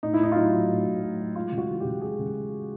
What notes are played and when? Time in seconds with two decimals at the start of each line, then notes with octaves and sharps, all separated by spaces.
0.03 A2 D#4
0.14 E4
0.20 A2 D#4
0.32 F4
0.36 F#3 E4
0.53 F#3
0.70 A2
0.86 A2
1.02 F#3
1.19 F#3
1.36 G#3 F4
1.52 C#3
1.58 F#4
1.68 E3
1.80 C#3 G4
2.01 G#3 G#4
2.19 C#3